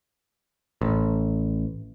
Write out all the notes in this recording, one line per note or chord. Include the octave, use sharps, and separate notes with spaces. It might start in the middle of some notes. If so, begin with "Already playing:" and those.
A1